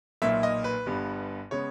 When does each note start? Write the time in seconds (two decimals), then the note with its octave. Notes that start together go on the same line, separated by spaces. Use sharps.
0.22 B1 A#2 A#3 E5
0.43 D#5
0.64 B4
0.86 G1 G2 G3 B3
1.51 C#3 G#3 B3 C#5